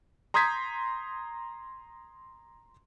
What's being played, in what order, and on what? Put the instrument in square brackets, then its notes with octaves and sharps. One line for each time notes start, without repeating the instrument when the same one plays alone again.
[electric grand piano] A#5 C6 D#6 G6 G#6 B6